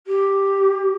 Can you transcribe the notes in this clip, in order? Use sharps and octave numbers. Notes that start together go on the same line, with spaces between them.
G4